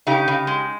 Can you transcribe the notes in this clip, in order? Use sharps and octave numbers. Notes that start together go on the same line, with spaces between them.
C#3 D#4 G4
C#3
G#3